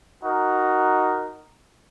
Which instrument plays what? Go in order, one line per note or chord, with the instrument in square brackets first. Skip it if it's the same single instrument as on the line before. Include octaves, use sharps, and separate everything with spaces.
[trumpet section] D#4 F#4 A#4